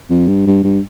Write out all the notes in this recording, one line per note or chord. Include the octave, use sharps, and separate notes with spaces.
F2
G2
G2
G2